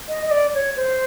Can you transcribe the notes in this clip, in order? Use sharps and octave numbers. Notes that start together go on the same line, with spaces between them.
D#5
D#5
D5
C#5
C5